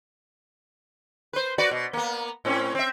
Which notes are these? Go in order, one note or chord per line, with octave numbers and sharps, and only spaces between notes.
B4 C5
F#4 B4 D5
B2
A#3 B3
A2 C4 C#4
C4 E5